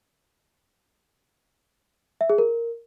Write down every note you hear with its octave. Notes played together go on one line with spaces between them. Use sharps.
E5
G#4
A#4